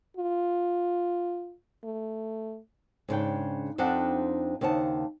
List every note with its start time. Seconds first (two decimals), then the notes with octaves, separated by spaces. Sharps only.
0.17 F4
1.84 A3
3.08 G#2 C#3 D4 G5
3.78 F2 C4 D4 D#4 F#5 A5
4.61 D#2 C#3 C5 F#5 A5